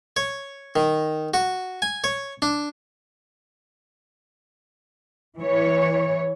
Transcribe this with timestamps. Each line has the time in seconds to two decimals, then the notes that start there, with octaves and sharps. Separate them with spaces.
0.16 C#5
0.76 D#3
1.34 F#4
1.82 G#5
2.04 C#5
2.42 D4
5.38 E3 C#5